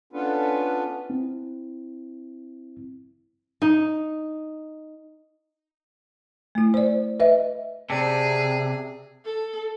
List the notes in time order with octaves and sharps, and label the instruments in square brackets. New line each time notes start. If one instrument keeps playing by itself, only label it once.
[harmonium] B3 C#4 D4 F4 A4 B4
[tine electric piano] C4 E4
[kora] D#4
[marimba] A3 E4
C5 D5
B4 D#5 E5
[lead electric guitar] C3 [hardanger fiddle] G#4 [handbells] C5 D5 A5
[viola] A4